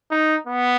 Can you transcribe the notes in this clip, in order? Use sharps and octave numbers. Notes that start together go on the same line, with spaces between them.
D#4
B3